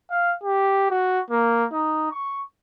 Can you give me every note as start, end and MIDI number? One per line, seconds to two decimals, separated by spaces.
0.11 0.34 77
0.44 0.88 67
0.90 1.20 66
1.31 1.65 58
1.72 2.08 63
2.12 2.41 85